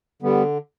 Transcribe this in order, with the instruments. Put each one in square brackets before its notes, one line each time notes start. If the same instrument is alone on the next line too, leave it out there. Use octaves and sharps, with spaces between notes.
[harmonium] D3 G3 B3